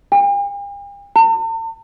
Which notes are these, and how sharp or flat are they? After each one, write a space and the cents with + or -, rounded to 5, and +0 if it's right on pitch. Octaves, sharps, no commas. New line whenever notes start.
G5 +45
A5 +45